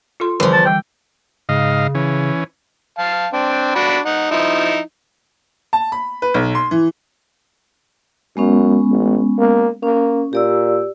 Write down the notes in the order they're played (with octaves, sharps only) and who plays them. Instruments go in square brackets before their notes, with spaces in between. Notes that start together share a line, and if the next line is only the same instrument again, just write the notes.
[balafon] F4 A4 C6
[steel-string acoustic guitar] E2 F3 [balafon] D3 G3
[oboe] A5
[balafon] E3 G3 [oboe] G5
[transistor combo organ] G#2 D#5 F5 [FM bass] C#3
[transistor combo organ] E3 C#4
[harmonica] F5 A5
C4 D4
D4 F#4 B5
D#4 F#5
F3 D#4 E4
[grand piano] A5
B5
B4
B1
C6
E3
[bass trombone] F#2 [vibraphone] G#3 B3 C#4
[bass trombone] A1
A#3
[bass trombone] A#3 [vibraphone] C#4
[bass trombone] A#2 [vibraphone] G4 D5 E6